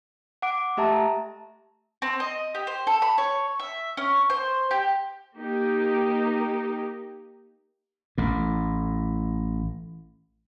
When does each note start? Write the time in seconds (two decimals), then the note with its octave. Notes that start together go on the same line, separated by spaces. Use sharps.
0.42 F#5 D6 D7
0.77 A3 G4 E5 A5 A#5
2.02 C4
2.20 D#5
2.55 G4
2.67 C5
2.87 A4
3.02 B5
3.18 C#5
3.60 E5
3.97 C#4
4.30 C5
4.71 G4
5.38 A#3 D#4 G4
8.18 A1 A2